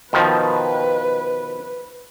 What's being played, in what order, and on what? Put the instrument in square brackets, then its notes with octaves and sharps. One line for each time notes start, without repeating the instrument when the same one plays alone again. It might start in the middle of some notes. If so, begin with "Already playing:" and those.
[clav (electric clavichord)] B2 D#3 F3 [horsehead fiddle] B4